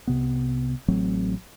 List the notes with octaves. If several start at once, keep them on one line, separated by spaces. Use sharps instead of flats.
C2 C3 B3
A1 F#3 A3 C4